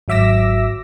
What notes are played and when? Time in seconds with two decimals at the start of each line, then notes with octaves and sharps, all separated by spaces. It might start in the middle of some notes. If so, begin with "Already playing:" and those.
0.08 G#1 F#3 E5 D6 E6 A#6